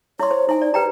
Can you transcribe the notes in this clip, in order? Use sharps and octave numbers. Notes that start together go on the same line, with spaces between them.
E4 C#5 C6
C5
D#4 E4 G#5
D5
G4 B4 G5 A#5